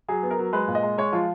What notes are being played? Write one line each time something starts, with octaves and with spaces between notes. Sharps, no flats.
F#3 G#4
B3
A#4
F#3
G#3 B4
A#2
D#5
G#3
G#3 C#5
F3 F4